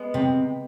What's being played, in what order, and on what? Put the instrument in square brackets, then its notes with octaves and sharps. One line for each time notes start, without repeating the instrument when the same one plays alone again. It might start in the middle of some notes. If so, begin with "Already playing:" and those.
Already playing: [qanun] G#3 B3
[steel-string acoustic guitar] C3